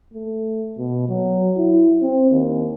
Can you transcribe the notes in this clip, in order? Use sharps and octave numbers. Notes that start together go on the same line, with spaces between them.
A3
B2
F#3
E4
C4
D#2